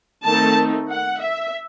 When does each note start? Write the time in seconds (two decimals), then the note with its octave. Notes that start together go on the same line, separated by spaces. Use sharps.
0.25 D#3 A3 C4 D#4 A5
0.89 F#5
1.22 E5